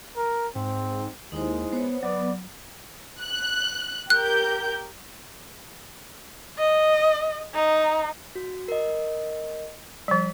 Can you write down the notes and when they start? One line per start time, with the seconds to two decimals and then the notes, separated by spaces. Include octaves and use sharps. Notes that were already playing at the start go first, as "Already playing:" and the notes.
0.16 A#4
0.56 G#2 C4
1.32 D#2 G#3 D#4 E4 C5
1.73 B3 C5 C#5
2.03 F#3 B3 D5
3.22 F#6
4.10 G4 A#4 F#6 G6
6.58 D#5
7.54 D#4
8.35 F#4
8.68 A#4 D#5
10.08 F3 G3 B6